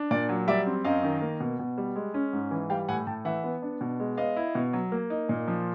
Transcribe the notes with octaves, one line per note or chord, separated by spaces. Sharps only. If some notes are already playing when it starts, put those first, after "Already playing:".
Already playing: D4
A#2 D5
F#3
G3 D5 E5
C4
F#2 D#5 F5
D#3
A#3
B2
B2
G3
G#3
C#4
G#2
E3
G3 F5 G5
A2 F#5 G#5
A2 G5 A5
E3 E5 F#5
B3
D4
B2
G#3
B3 D#5 F5
E4
B2
F#3
A#3
D#4
A#2
F3